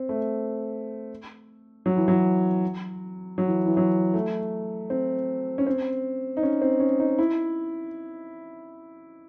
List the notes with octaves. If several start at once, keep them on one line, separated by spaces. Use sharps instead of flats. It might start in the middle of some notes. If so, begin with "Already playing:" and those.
Already playing: C4
A3
F#3
E3
F#3
F#3
E3
E3
F#3
A3
C4
C#4
C4
D#4
C#4
C4
C#4
D#4
E4